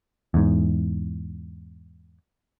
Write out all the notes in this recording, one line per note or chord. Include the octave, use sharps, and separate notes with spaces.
E2 G#2